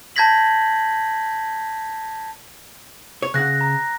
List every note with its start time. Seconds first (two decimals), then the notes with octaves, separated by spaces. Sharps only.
0.16 A5 G6 G#6 A#6 B6 F#7
3.22 C#5
3.34 C#3 F#5 F#6 A#6
3.61 A#5